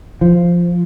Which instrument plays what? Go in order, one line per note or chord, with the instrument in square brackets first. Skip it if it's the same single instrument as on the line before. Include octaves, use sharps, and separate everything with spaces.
[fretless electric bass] F3